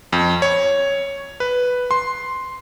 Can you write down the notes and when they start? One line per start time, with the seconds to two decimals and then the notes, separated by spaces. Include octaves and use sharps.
0.13 F2
0.42 C#5
1.40 B4
1.91 C6